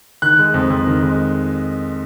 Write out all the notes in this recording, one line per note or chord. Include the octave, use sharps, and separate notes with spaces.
D#3 F#6
G#3
F2
F2
D#3
G#3